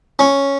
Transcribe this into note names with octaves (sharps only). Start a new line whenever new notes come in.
C#4